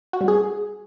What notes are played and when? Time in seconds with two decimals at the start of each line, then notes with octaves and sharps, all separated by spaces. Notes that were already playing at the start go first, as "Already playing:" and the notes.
0.13 F#4
0.21 G3
0.28 G#4